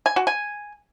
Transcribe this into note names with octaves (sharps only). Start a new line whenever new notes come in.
G#5
F#4
G#5